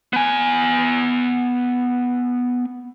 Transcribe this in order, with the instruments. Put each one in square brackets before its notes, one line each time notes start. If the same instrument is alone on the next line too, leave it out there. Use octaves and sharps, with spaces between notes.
[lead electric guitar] B3 G#5